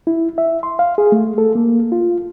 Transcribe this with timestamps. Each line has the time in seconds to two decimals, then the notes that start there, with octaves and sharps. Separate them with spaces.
0.07 E4
0.38 E5
0.63 C6
0.79 F5
0.98 G#4
1.12 A3
1.38 A4
1.55 A#3
1.92 F4